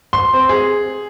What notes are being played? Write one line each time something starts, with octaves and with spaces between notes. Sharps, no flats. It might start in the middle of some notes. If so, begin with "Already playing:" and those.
C6
C4
G#4